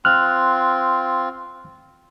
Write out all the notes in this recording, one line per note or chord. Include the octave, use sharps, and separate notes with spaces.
C4 F4 F6 F#6